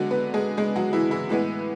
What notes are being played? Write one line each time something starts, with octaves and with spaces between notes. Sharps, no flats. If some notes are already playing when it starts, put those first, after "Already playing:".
Already playing: D3 F#3 G#3 B3 F#4
B3 B4
G#3 G#4
G#3 G#4
F#3 F#4
E3 E4
E3 E4
A2 E3 G#3 B3